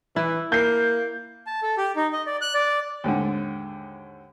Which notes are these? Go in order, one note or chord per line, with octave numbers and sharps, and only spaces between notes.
E3 E4
A#3 G6 C7
A5
A4
G4
D#4
D#5
D5
F#6
D5
D#2 G#2 D3